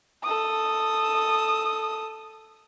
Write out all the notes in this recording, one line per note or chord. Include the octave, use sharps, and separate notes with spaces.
A4 D#6